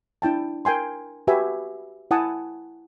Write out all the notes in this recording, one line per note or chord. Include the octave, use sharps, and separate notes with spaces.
D4 E4 G5 A5
A#4 G5 G#5 C6
F#4 G4 B4 E5 G#5
E4 F#5 G#5 A5 D#6